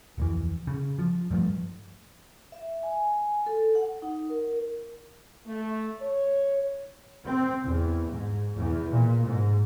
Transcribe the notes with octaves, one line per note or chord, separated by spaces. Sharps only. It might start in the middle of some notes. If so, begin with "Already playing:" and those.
D1 F2 E3
C#3
F3
G2 F3 A3
E5
G#5
A4
F#5
D#4
A#4
A3
C#5
C4
E2
G#2
E2
A#2
G#2